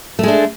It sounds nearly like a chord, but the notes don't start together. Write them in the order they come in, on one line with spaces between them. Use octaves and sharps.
A3 G#3 D4